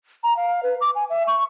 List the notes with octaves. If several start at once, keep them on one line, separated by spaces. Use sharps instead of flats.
A#5
F5
B4
D6
G#5
E5
C#6